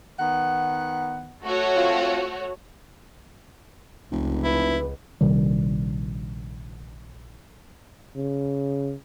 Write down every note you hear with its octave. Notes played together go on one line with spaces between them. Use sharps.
D#3 B3 F#5
A3 F#4 C#5
C4 F4
F1 C#2
E4 B4
A#1 C3 D#3 G3
C#3